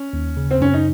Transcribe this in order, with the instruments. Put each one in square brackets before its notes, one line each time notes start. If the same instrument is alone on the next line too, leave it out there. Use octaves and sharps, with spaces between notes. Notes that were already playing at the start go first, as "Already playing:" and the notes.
Already playing: [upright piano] C#4
[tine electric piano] D#2
C#3
[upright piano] C4
[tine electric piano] F#2 [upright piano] C#4
[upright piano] D#4